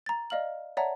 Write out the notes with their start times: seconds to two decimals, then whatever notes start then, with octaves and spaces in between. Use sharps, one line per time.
0.06 A#5 A6
0.30 D5 D#5 F5 F6 F#7
0.77 C#5 D5 E5 F#5 A5 A#5